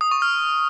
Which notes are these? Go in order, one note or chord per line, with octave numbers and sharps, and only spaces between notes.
D#6
C#6
F6